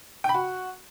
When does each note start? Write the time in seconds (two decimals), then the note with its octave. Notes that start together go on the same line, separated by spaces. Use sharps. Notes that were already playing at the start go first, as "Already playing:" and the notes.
0.24 G5
0.29 B5
0.34 F#4